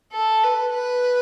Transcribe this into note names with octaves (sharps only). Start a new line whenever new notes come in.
A4
B4
B4